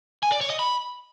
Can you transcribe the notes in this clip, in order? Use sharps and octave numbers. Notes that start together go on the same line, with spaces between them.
G#5
D5
C#5
D#5
B5